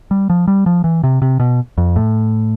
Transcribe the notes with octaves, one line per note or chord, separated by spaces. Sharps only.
G3
F3
G3
F3
E3
C3
C3
B2
F2
A2